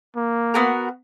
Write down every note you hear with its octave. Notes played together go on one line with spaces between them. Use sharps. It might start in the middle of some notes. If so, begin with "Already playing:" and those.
A#3
B3 F#4 A#4